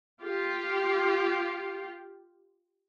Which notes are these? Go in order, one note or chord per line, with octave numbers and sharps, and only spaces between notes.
F4 G4